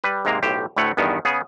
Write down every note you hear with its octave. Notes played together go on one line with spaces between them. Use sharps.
G3 B4
G#2 C3 G#3 A#3 A#5
B1 A2 G4 C5
D2 A2 A3 C#5 F#5
E2 G2 D#3 B3
C#3 B3 G#4